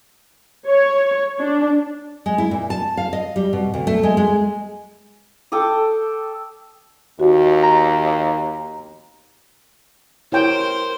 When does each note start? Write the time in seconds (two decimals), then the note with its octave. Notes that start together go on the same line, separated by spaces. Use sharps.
0.66 C#5
1.39 D4
2.26 G#3
2.38 E4
2.51 A#2
2.70 A5
2.97 F5
3.13 D#5
3.36 G3
3.53 B2
3.74 D2
3.87 A3
4.03 G#3
4.17 G#3
5.52 A4 G5 D6 D#6
7.20 D#2 F#4
7.63 A#5
10.32 E4 A#4 C5 C#5 G5